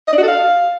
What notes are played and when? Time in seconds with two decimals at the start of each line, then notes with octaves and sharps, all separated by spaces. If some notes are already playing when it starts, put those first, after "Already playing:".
0.08 D#5
0.13 D4
0.18 F#4
0.23 A4
0.28 F5